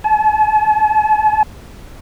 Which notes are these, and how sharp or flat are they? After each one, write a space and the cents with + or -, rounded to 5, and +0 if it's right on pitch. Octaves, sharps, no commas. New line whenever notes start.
A5 -45